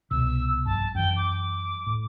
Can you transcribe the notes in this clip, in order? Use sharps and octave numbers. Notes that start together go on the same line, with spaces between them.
C2 B2 E6
A#1 G2 A5
F#2 E3 G5
D6
A2